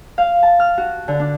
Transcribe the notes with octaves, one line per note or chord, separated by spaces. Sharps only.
F5
A5
F6
F#4
D3
D4